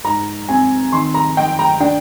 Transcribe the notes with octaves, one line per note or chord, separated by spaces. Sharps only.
G#2 A#5
C4 G#5
D#3 C6
A#5
D#4 G5
A#5
D4 G5